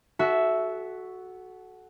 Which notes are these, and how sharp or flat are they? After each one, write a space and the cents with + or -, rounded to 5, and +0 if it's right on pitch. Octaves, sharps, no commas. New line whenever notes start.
F#4 +0 A4 -30 E5 +0